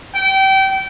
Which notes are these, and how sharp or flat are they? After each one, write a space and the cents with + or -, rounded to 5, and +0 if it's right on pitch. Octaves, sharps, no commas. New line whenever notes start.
G5 -25